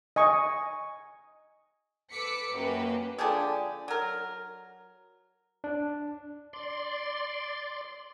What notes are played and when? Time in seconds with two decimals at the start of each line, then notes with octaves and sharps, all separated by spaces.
0.16 D#5 G#5 C#6
2.11 A4 B4 D6 B6 C#7
2.52 F#2 A#3 G4 B4
3.18 D3 F3 G4 G#4
3.88 F#3 A#4
5.64 D4
6.53 D5 C6